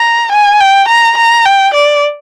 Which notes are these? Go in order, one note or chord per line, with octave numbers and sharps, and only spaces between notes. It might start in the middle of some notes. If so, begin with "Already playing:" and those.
Already playing: A#5
G#5
G5
A#5
A#5
G5
D5